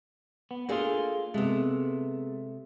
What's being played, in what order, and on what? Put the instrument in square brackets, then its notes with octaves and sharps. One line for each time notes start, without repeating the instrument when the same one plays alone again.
[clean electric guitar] B3
[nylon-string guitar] A3 D4 G#4 [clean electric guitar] A#3 F4
[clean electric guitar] C3 A3 [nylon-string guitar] G#3 B3